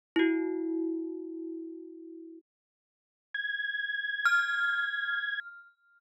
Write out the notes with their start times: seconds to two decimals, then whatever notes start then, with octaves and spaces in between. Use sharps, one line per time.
0.16 E4 F#4
3.34 G#6
4.25 F6